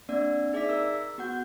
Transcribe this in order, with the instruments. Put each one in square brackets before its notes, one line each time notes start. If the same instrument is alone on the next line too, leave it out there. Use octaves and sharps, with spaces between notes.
[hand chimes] A#3 C4 D4 D5 E6
D#4 G#4 D5 E5 D6 B6
A#4 E6
B3 F#4 F#5 G6